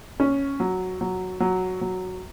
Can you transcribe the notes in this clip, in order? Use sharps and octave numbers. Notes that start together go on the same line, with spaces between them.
C#4
F#3
F#3
F#3
F#3